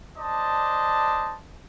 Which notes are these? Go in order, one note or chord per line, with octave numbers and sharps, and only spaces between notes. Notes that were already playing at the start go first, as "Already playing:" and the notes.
D4 C5 D5 D#5 A5